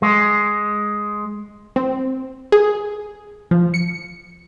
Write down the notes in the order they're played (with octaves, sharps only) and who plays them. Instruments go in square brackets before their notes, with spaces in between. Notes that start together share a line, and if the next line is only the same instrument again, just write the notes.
[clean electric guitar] G#3
[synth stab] C4
G#4
F3
C#7